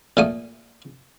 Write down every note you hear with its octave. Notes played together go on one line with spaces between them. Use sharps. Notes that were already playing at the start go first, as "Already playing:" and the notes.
A#2 A3 D#6